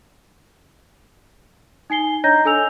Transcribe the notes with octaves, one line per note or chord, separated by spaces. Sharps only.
D#4 G#5 C7 G7
D4 C#5 D#5 A#5 G6 A#6
D4 A4 G#5 E6 F7